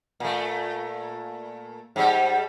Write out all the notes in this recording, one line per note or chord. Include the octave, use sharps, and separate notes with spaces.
A#2 A3
G#2 G3